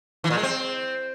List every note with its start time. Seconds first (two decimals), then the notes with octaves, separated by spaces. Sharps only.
0.24 E3
0.30 A#2
0.37 G#3
0.43 C4